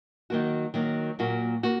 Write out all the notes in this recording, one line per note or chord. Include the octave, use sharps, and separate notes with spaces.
D#3 F#3 A#3 F#4
D#3 F#3 A#3 F#4
A#2 F#3 A#3 F#4
A#3 F#4